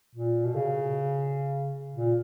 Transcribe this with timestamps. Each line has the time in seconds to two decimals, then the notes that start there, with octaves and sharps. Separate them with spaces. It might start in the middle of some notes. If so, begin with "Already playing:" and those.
0.15 A#2
0.45 B2
0.55 C#3
1.96 A#2